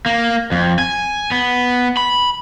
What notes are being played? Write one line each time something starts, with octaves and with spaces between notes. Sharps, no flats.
A#3
F2
G#5
B3
B5